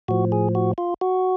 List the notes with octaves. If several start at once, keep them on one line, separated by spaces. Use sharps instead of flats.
A2 F3 F#4
G#4
F#4
F4
F#4